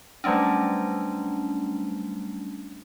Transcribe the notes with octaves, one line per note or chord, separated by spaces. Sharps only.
F#3 G3 A3 C#4 D4